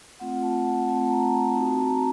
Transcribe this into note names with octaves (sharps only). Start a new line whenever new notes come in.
A3 C4 F4 F#5
A5
F#5
A3 C4 F4 A5
A5
A#5
C4 D#4 F#4 A5
A#5